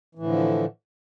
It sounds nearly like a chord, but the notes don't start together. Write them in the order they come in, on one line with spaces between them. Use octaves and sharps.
E3 A2 D3 F3